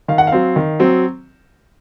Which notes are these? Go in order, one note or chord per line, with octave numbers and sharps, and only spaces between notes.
D#3 F5
F#5
F5
F#3 C4
D#3
F#3 C4